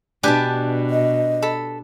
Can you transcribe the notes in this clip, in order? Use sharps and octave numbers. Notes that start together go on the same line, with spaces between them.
B2 D4 G4 B4 G#5 A5
D#5
A4 B5